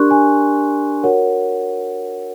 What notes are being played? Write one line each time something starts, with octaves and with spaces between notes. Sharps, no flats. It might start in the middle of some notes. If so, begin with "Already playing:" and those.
Already playing: D4 G4 A#4 D5 C6 C#6 F#6
G#5
F#4 A#4 C#5 F#5